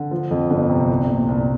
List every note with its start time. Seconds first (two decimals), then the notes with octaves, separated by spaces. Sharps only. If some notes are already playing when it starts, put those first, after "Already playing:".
Already playing: D3
0.11 F3
0.31 F2
0.51 G1
0.70 C3
0.89 C2
1.10 A#2
1.29 C2